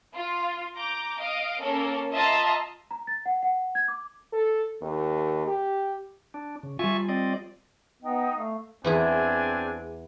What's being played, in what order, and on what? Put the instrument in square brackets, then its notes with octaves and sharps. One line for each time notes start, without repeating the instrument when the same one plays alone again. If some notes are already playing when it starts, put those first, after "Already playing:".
[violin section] F4
A#5 D6 G6
D#5 F5 D7
A#3 C#4 A4 A#4
F4 D#5 E5 A5 A#5 C6
[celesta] A#5
A6
F#5
F#5
G#6
D6
[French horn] A4
D#2
G4
[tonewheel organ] D4
C#3
[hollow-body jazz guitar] G3 F4 [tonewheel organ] E5 G#5 C#6
[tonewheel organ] C4 D5 D#5
[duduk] B3 [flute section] D#4 D#5 G5
[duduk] A3 [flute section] F5
[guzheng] E2 E4 G#4 [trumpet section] C4 D4 G#5